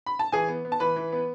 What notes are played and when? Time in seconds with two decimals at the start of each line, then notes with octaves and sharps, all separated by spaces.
0.06 B5
0.19 A5
0.32 E3 G#4 G#5
0.48 B3
0.65 B3
0.72 A5
0.80 E3 B4 B5
0.96 E3
1.12 B3